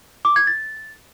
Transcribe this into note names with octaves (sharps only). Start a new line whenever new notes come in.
D6
G#6
A6